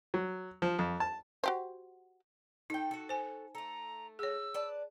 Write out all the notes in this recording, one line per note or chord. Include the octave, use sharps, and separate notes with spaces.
F#3
F3
F2
A5
F#4 G4 C5
D#4 A4 G5
F#4 A4
C5 G#5
A3 A4 A#5
G#4 C#5 E6
B4 D5 A5